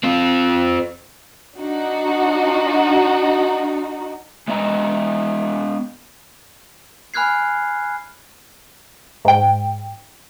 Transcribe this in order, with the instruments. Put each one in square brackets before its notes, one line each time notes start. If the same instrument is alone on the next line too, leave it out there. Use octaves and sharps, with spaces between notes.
[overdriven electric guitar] C4 F4
[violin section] D4 D#4 F#4
[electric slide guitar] G#3 B3 D#5 A#5
[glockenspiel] G#5 B5 F6 F#6 G#6 C7
[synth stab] G#2 G5